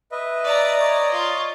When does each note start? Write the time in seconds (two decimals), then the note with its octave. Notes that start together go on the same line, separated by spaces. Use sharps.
0.12 B4 D#5 E5
0.44 D5 A#5
0.80 C#5 D#5
1.12 F4